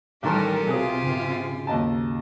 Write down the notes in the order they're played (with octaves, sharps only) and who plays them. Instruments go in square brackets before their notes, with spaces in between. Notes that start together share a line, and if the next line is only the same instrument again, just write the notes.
[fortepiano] A1 D#3 C6 [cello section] G3 A4 A#4 [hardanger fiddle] G4 G#5
[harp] B1 [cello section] C3 F4 [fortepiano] F#3 G#4 D#6
[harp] G#2 C#3
[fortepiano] D#2 D#5 A5